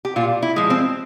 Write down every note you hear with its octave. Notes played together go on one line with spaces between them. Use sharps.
G4
A#2 F4
E4
F3 G#3
C4